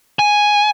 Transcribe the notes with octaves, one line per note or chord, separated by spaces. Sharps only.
G#5